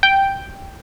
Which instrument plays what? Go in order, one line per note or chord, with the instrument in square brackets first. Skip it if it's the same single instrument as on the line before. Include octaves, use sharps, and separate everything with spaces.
[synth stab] G5